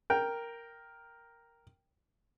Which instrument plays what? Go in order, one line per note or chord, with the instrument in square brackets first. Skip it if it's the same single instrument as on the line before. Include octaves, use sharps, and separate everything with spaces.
[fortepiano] A#4 G5